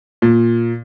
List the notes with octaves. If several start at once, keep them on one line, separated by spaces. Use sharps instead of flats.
A#2